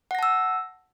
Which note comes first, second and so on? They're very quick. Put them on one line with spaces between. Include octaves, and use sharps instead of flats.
F#5 A#6 A5 E6